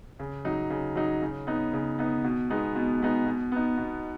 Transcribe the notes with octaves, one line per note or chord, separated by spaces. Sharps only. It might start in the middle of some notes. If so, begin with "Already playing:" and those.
C#3
F#3 D#4
C#3
F#3 D#4
C#3
B3 D#4
C#3
B3 D#4
B2
G#3 B3 D#4
B2
G#3 B3 D#4
B2
B3 D#4
B2